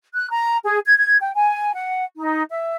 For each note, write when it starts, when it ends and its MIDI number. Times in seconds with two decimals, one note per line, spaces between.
0.13 0.29 90
0.30 0.57 82
0.64 0.77 68
0.85 0.96 92
0.97 1.17 92
1.19 1.30 79
1.34 1.72 80
1.73 2.03 78
2.17 2.41 63
2.50 2.76 76